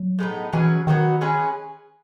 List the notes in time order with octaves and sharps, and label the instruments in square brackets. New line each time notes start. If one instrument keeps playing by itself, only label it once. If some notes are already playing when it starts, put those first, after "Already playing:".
Already playing: [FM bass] F#3
[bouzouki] A2 G#3 B3 D#4
[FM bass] E3 [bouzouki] F#3 C#4 G#4 B4
[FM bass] D#3 [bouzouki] F#3 B3 D#4 F#4
[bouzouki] G#3 C#4 G#4 B4